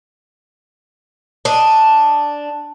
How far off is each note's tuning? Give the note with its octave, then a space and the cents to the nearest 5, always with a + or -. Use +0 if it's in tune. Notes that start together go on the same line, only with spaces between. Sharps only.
D4 +0 D#5 +0